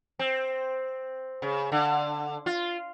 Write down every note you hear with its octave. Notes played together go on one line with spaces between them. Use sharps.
C4
C#3
D3
F4